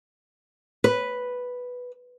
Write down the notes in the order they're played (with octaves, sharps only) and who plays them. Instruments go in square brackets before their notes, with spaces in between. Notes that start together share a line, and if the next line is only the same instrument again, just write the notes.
[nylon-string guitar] B4